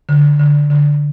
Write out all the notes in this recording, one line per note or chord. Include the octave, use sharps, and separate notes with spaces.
D3
D3
D3